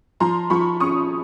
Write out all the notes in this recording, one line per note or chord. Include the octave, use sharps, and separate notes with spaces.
F3 A#5 C6
F3 B5 C#6
C#4 C#6 D#6